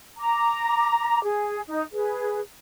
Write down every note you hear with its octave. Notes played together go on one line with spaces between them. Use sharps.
A#5 D6
G#4
D#4
G#4 B4